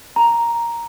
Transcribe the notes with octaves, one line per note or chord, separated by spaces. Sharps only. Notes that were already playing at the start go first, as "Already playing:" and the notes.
A#5